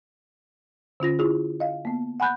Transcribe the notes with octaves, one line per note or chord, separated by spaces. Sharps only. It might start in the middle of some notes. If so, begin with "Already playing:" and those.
D3 C#4 F4 A#6
E4 F4 G#4
D#5 F5
A#3 B3
F#5 G#5 B5 F#6 G6